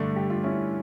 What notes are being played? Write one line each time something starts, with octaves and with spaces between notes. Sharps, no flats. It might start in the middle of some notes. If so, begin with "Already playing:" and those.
Already playing: G2 D3 A3 D4
G4
F4
C#4 E4